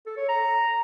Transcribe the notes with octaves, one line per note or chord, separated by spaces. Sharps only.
A4
C#5
A#5